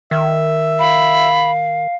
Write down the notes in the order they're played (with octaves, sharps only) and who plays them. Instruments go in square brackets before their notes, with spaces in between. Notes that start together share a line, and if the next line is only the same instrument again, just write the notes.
[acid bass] D#3 [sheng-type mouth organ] E5
[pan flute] F5 [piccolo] B5